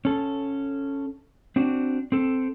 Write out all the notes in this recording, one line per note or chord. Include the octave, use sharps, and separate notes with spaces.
C#4 A4
C4 D4 F#4
C4 A4